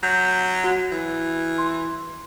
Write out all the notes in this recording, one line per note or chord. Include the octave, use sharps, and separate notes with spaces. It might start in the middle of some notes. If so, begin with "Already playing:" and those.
F#3 G6
F#4
E3
C6